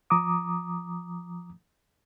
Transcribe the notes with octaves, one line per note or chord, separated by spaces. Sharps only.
F3 A#5 D6 D#6